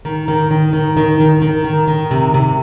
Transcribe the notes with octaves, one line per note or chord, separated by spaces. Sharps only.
D#3
D#3
D#3
D#3
D#3
D#3
D#3
D#3
D#3
C3
C3